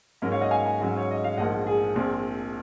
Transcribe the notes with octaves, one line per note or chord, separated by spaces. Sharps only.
G#2 F#3 A#3 C#4 A#4
C#5 F5
D#5 F#5
F5 G#5
F5 G#5
G#2 F#3 C#4
C#5
D#5
F5
A#1 G#2 F3 A#3 D#5 F#5
G#4
A#1 A#2 F3 C4